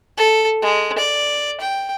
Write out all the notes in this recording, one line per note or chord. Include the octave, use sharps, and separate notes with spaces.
A4
G#3
D5
G5